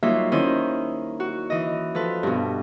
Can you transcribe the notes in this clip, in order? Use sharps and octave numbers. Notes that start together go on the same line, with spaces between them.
F#3 G3 A#3 D#4 F4 E5
D#3 C#4 E4 C5 D#6
F#4
E3 D#5
F3 A4 B4
G2 B2